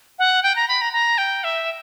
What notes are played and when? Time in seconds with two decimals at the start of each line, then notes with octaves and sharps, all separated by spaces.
0.19 F#5
0.43 G5
0.56 A#5
0.68 B5
0.81 A#5
0.93 A#5
1.18 G5
1.44 E5